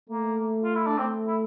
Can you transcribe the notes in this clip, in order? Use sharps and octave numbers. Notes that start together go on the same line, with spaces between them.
A3 A#3
F4
E4
D4
A3 C4
E4